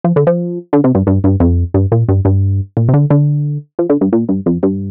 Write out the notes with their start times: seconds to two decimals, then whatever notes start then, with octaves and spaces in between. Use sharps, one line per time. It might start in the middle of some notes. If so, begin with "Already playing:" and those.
0.04 F3
0.16 D3
0.27 F3
0.73 D3
0.84 C3
0.95 G2
1.07 G2
1.24 G2
1.40 F2
1.74 G2
1.92 A#2
2.09 G2
2.25 G2
2.77 A#2
2.89 C3
2.94 D3
3.10 D3
3.79 F3
3.89 D3
4.01 G2
4.13 A#2
4.29 G2
4.46 F2
4.63 G2